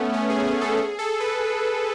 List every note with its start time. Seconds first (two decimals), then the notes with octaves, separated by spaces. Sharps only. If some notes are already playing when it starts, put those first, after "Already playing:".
Already playing: A3 B3 C#4
0.14 C#4
0.30 G#4
0.46 G#4
0.61 A4
0.78 G#4
0.99 A4
1.20 B4